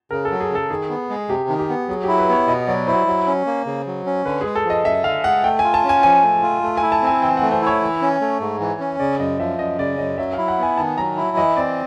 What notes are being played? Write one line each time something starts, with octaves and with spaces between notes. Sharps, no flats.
C#3 A#4
A4
F#3
G#4
C#3 A4
D#3 G#4
B3
G#3
C3 G4
D#3
G4
B3
F#3 G#4
E4 G4
B4
B3 C#5
B2 D#5
F#3 D5
E4 C5
F#3
C#4
A#3
C#3
F#3
C#4
D3 B4
G#3 G#4
A4
F3 D#5
F#2 E5
D3 F5
G#3 F#5
A3 G5
G#5
F4
A5
C#4
G#5
F3 G#5
A3
F4
A3
G#5
E4
A5
C4 G#5
E3 G5
A3 F#5
C5
E4
C#5
E3
C#4
A3
G#2
E3
C#4
C#3 D5
F#2 D#5
F3 E5
F#2 D#5
C#3 D5
F#2 D#5
F#3 E5
E4 F5
F#5
B3 G#5
D#3 A5
F#3 A#5
E4
E3 D#5
C4 D5